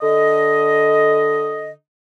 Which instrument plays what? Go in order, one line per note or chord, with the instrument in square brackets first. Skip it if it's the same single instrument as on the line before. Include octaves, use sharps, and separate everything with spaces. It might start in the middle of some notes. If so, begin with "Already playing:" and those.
[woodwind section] D3 D#5